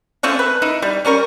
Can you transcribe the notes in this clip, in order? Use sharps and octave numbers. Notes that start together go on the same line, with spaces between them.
A3 C4 C#4 F4
B4
D#4 E4
G3
G3 C#4 A#4 C#6